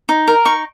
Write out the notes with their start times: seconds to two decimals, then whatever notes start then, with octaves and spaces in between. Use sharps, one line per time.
0.09 D#4
0.28 A#4
0.45 D#4 C#6